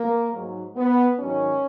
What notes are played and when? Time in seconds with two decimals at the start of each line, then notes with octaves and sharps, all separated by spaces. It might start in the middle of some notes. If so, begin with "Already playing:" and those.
Already playing: A#3
0.32 G#2 F#3
0.75 B3
1.18 G#2 D#3 F#3 C#4